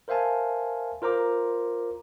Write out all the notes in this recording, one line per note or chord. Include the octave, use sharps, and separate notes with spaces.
A#4 C5 E5 F5 G#5 A5
F4 A#4 C5 A#5 D6